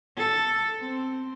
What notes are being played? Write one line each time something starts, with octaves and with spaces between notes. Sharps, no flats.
A4
C4